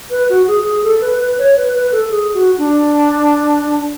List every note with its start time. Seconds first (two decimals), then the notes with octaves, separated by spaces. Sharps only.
0.11 B4
0.29 F#4
0.47 G#4
0.65 G#4
0.83 A4
1.01 B4
1.20 B4
1.38 C#5
1.57 B4
1.74 B4
1.92 A4
2.10 G#4
2.34 F#4
2.58 D4